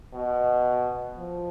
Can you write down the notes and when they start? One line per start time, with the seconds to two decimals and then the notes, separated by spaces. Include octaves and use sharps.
0.14 B2
1.18 F3